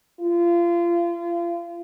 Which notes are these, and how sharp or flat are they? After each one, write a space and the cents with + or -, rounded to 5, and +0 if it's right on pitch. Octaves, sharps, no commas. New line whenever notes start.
F4 -30